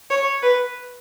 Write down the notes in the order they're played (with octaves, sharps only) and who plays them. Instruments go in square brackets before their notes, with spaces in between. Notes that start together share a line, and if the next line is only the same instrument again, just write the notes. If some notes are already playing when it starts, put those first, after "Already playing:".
[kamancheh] C#5
B4